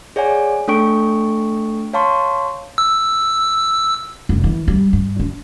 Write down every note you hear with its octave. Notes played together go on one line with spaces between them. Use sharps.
G#4 C#5 D5 F#5 G#5
A3 D4 A4 G5 C#6 D7
C#5 F5 A5 C6 C#6
E6
F1
E3
G3
G2
D4